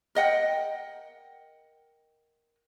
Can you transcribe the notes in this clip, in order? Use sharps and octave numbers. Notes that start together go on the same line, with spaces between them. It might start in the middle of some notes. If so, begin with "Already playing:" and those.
A#4 D#5 F#5 G5